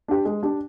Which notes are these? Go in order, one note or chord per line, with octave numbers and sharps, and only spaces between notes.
D4 G4
G#3
D4 G4